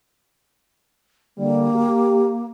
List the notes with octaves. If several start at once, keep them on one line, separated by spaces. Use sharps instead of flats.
D3 G3 A#3
G4